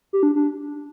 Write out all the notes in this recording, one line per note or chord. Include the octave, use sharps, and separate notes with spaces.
G4
D4
D4